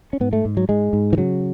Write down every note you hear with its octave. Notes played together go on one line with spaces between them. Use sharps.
C#4
G#2 B3
A3
G#2
F#3
G#2 G#3
G#2
E3
C#3 F#3